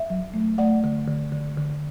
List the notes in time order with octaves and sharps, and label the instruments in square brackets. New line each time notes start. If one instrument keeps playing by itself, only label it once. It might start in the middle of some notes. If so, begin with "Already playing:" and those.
Already playing: [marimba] E5
F#3
A3
A3 D5 F#5
D3
D3
D3
D3